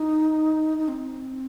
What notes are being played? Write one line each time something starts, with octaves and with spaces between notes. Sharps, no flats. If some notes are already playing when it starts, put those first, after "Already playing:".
Already playing: D#4
D#4
C4